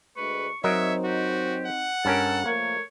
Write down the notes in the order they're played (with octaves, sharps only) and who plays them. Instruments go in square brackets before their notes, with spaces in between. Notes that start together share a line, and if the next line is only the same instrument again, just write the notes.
[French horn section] D2 G#3 [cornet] B4 [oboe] C#6
[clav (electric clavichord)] F#3 A#4 D#5 [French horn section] C4 D#4 [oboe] C#5 [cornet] E5
[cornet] F#4 [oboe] G4
[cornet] F#5
[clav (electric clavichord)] G2 C#4 A#4 [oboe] A4
[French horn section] F3 A3 A#4 [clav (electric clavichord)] A#3 [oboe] C#5